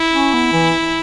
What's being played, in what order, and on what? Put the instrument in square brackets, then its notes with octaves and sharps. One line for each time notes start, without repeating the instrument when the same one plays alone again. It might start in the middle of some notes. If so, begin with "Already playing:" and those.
Already playing: [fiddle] E4
[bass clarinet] C#4
B3
E3